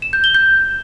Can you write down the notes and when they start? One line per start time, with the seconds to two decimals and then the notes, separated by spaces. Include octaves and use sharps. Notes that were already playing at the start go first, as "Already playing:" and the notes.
0.02 E7
0.13 G6
0.24 G7
0.35 G6